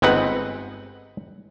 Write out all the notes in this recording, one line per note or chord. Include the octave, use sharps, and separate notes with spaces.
G1 G#3 C4 D#4 B4 F#5